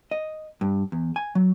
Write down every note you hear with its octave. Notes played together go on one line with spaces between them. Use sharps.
D#5
G2
E2
G#5
F#3